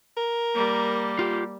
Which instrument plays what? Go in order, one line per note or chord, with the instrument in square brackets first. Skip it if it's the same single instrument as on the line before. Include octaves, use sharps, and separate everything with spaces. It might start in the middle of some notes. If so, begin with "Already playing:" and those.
[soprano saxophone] A#4
[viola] G3 A#3
[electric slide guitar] F4 G4